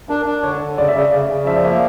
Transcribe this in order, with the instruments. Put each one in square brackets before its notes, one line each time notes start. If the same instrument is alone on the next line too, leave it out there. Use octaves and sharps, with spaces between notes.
[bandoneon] D4 [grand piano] A#4
[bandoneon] D4
[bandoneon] D3 [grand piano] C#5
[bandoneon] D3
[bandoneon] C#3 [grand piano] D5
[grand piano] E5
[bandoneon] C#3 [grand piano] D5
[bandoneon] C#3 [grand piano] D5
[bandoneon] C#3
[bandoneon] F3 [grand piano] E5
[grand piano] D5
[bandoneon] A#3 [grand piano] E5